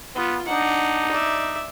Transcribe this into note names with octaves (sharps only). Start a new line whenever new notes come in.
B3 F4
D4 D#4 F#5
D5 E5